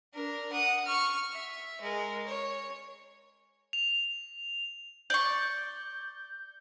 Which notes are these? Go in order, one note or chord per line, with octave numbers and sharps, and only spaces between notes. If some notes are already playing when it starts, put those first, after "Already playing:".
D4 A#4
F#5 D#6
C#6 F6
E5
G#3 A#4
C#5
F7
D5 C#6 G6